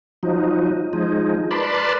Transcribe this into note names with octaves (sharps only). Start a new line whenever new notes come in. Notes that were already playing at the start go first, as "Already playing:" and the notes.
F3 F#3 D#4
F3 G#3 D#4
A#4 B4 D5 A5 B5 C6